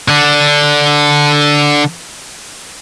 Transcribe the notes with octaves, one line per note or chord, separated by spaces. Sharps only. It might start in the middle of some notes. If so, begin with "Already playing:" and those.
D3 D4